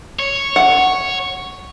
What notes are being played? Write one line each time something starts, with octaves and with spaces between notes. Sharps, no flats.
C#5
F#5